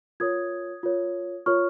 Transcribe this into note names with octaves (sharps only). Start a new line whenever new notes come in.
F4 A#4 C#5 D#6 G#6
F4 A#4 C#5
F4 A#4 C#5 C#6 F6